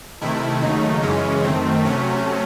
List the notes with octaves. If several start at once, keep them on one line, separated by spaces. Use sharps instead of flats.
C3 D#3 A3 E4
D#2 C#3 F#3 A3 D#4
F#2 C#3 E3 G#3 C#4
F#2 D#3 A3 C4
C3 F#3 A3 C#4